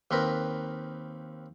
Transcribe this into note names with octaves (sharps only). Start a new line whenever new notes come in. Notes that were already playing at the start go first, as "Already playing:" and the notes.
D#2 C4 A#4 B4